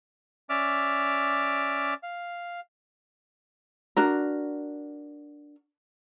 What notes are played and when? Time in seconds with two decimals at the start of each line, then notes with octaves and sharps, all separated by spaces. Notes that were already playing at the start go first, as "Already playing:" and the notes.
0.50 C#4 D5 E5 D6 F6
2.03 F5
3.96 D4 F#4 A#4